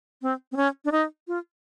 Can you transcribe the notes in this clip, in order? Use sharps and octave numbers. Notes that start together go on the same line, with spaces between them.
C4
C4
C#4
D4
D#4
F4